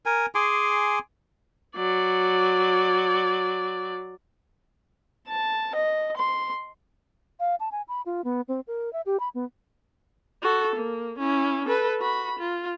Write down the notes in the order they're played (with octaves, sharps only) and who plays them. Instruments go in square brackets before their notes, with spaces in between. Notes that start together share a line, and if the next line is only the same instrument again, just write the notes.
[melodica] A#4 G#5
G#4 G#5 C6 D6
[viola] F#3 D5
[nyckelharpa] A5
D#5
C6
[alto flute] F5
A5
G#5
B5
F4
B3
C4
A#4
E5
G4
B5
B3
[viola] F#4 A4
A#3
C#4 E4
A4 B4
F#4 B5
F4